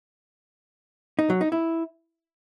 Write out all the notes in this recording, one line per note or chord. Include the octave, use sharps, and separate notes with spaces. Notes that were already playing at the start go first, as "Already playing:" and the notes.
D#4
F#3
D#4
E4